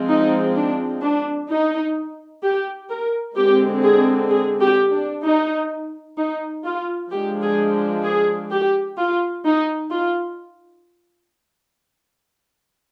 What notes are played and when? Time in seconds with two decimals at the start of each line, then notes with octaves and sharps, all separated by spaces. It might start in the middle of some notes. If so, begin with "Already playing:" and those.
Already playing: F3 G#3 C4
0.10 D#4
0.56 D4
1.02 D4
1.50 D#4
2.43 G4
2.90 A#4
3.36 D3 G#3 C4 G4
3.84 G#4
4.30 G#4
4.62 G4
4.93 D4
5.24 D#4
6.18 D#4
6.64 F4
7.11 F3 G#3 D4 G4
7.42 G#4
8.05 G#4
8.51 G4
8.98 F4
9.45 D#4
9.91 F4